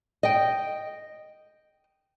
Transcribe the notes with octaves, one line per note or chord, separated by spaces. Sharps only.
D#5 G5